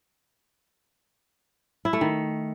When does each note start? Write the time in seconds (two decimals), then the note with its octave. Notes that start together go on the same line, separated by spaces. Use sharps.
1.85 E4
1.93 A3
2.01 D#3